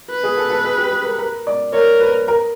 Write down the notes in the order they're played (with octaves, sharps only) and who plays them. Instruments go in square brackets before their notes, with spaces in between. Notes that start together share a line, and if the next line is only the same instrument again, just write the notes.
[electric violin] B4
[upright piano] G#4
A4
A4
G#4
G4
G#4
A#4
A#4
D5
[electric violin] A#4 [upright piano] C#5
[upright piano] B4
A#4